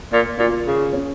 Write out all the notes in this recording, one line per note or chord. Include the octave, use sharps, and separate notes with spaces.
A#2
A#2 F4
C#3
C#4